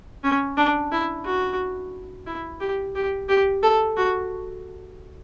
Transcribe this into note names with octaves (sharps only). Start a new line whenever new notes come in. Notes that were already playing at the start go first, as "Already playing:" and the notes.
C#4
D4
E4
F#4
E4
G4
G4
G4
A4
F#4